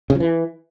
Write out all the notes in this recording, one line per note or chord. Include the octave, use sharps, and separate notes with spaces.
C#3
F3
E3